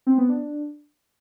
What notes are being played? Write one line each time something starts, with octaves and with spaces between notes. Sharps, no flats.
C4
B3
D4